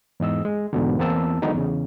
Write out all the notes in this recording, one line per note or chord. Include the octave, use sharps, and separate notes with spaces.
E2 G#2 D#5 E6
G#3
E2 G#2 B2 D3
E2 A#3 C4 A5 E6
D3 D#3 F#3 G#3 B3 D#4
E2 C#3